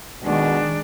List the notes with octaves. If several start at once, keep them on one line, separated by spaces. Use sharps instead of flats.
B2 D#3 G#3 D4